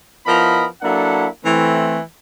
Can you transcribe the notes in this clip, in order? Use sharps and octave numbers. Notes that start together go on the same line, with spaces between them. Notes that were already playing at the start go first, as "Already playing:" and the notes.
F3 B3 E4 A#4 D#5 B5
F#3 A#3 D4 E4 A4 F#5
E3 A3 C4